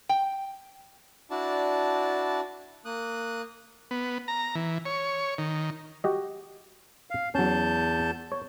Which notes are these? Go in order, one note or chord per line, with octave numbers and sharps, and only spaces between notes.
G5
D4 E4 F#4 D5 A5
A#3 D#6 F#6
B3
A#5
E3
C#5
D#3
F#4 G4 D#5
F5
E2 F#3 C#4 A5 G6
C#5